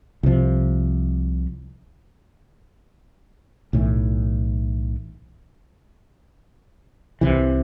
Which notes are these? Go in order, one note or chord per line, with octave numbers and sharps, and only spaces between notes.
C2 C3 F3
B1 A2 E3
C2 C3 E3